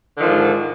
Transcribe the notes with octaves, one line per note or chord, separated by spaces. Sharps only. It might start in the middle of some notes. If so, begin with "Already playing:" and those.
G#2 D3 D#3 F3